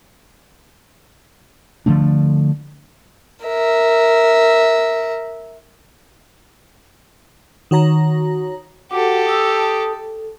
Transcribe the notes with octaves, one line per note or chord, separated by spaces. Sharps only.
D3 F3 A3 D4
A#4 E5
D#3 F#4 C#5 A#5 A#6
F#4 G4 A4 F#5 D6
D#6 E6
A5 D#6
A4